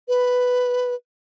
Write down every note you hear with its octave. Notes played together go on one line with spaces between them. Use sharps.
B4